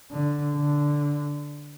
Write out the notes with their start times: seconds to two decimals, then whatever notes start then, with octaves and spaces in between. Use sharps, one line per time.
0.11 D3
0.56 D3